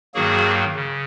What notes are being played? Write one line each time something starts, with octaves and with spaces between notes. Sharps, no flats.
G2 D#3 F#3 A#3 F#4 G#4
C#3